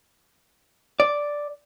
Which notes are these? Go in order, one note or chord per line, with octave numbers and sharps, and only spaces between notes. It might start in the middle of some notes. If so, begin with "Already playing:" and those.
D5